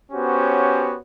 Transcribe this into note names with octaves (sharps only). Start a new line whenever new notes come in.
B3 C#4 F#4 G4 C5 C#5